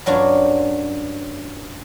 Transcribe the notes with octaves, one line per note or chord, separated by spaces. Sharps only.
G2 F#3 C#4 D4 F4